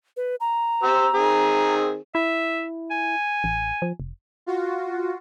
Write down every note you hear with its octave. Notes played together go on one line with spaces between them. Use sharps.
B4
A#5
G4 C5 E6
D#3 C4 G#4
E4 E5
G#5
A1
F3
F1
F4 F#4